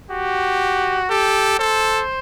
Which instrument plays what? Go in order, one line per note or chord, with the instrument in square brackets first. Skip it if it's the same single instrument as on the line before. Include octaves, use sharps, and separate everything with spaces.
[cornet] F#4 [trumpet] G4
[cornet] G4 [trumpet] A4
[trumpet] A4 [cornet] C5